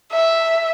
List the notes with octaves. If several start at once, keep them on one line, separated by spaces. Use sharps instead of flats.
E5